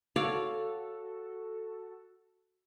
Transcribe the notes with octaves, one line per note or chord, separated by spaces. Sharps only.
F#4 A4 C#5 D5 F5